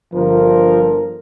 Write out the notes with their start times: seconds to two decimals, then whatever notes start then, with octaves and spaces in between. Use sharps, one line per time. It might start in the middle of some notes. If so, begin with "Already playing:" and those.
0.13 G1 F3 A#4